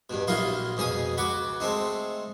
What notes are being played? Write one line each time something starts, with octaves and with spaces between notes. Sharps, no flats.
G2 B2
A#1 F#3 E4 F4 D#5 C6
F2 B2 G#4 D#6
C#2 F#4 B5 C#6 D6
G#3 A3 C4 D#4